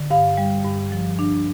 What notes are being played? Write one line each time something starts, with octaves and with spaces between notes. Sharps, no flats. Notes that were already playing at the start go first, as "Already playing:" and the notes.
Already playing: D3
G2 F5
G3
G2
F3
D4